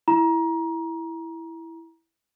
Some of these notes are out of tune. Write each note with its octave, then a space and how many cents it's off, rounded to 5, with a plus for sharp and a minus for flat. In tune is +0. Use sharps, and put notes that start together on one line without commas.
E4 +0 A#5 +25